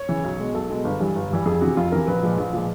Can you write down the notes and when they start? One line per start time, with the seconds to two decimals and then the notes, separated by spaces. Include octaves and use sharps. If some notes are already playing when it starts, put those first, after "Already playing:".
Already playing: C#5
0.09 C#3 E3
0.24 B1
0.39 B2 G#3
0.54 B1 A4
0.70 B2 G#3
0.84 G1
1.00 G2 E3 G3
1.16 G1
1.30 G2 E3 G3
1.46 F2 G#4
1.61 C3 E3 F#4
1.77 F2 F4
1.92 C3 E3 A#4
2.07 A#1 B4
2.23 A#2 F3 G#3
2.38 A#1
2.53 A#2 F3 G#3